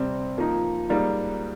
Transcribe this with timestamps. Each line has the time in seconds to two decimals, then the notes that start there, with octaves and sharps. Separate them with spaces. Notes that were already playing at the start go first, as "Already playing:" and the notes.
Already playing: C3 G3 C4
0.38 F3 A#3 D#4
0.89 G#2 G3 A#3 D#4